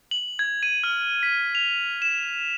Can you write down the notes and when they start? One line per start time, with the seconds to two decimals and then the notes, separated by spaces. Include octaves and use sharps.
0.11 F#7
0.39 G#6
0.63 D#7
0.84 F6
1.23 B6
1.55 F7
2.02 E7